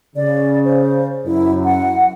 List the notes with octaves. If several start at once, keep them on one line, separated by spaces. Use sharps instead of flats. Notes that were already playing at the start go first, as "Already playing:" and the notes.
C#3 D5
C5
F#2 E4
F#5